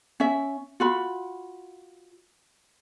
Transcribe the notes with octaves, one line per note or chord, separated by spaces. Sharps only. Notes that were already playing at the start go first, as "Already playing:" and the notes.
C#4 E5
F4 F#4 B5